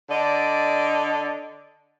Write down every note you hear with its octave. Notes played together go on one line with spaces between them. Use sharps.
D3 D5 D#5